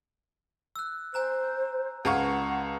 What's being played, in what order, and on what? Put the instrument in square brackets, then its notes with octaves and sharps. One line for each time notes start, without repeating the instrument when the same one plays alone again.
[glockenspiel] E6 F#6
[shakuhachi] C5 [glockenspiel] G#5 A#5 F#6
[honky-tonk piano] C#2 F5 C#6 [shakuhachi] F#5 [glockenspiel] A5 A#5 G#6